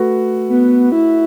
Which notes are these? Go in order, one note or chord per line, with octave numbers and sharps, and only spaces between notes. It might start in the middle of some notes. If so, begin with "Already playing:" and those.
Already playing: A3 F#4 B4
B3
E4